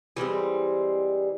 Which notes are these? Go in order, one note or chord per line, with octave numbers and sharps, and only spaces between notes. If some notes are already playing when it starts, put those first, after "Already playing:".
E3 G3 G#3 C4